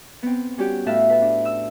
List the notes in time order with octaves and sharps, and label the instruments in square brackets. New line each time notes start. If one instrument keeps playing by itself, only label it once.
[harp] B3 C4
G3 C#4 F#4 G4
A2 E5 F5 A5 E6 F#6
B4 A5
D4
E6